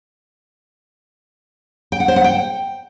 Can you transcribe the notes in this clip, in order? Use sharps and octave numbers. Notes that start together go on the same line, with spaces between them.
G5
F#5
C5
F#5
G5